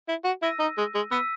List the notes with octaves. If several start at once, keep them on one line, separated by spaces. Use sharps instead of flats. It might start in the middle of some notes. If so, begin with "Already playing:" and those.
E4
F#4
E4 E6 A#6 D#7
D#4
G#3
G#3
B3 E6 B6 D#7